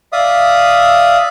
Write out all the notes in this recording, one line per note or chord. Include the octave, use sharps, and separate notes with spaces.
D5 E5 F5 D#6